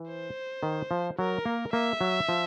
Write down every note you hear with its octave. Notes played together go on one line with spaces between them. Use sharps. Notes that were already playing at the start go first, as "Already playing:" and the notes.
Already playing: E3
C5
D#3
F3
F#3 A#4
A#3
A#3 E5
F#3
F3